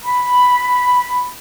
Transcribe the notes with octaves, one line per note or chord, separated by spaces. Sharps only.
B5